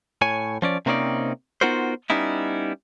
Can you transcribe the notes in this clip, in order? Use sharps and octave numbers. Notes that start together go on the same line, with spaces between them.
A2 C#5 G#5
F3 C#4 D5
C3 A#3 C4 C#4 D#4 D5
B3 D#4 F4 F#4 A#4 C5
G3 B3 C#4 D#4 E4